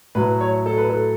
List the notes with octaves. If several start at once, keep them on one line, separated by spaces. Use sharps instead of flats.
A2 F#3 B4
C#5
A4
B4
A4